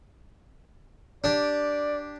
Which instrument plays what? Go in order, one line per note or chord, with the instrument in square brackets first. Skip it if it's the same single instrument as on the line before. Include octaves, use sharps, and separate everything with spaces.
[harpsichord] D4 G4 [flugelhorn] D5